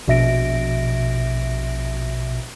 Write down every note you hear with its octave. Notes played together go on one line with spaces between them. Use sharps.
A#1 B2 E5 A#6 D7